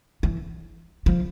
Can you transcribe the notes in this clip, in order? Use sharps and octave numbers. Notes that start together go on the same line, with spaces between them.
E3
F3